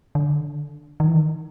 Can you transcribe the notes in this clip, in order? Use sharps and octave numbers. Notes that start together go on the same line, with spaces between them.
D3
D#3
E3
D#3